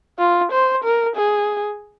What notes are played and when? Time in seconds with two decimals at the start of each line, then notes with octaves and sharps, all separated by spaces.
0.19 F4
0.52 C5
0.84 A#4
1.16 G#4